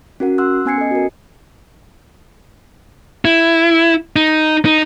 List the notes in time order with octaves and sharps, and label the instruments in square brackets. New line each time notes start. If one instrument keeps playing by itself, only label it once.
[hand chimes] C#4 F#4 A#4 F#5
F#5 C6 E6 F#6
B3 C#4 G#5 G#6 C7 C#7
A4 D#5
F#4 A#4
[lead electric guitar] E4
D#4
D#4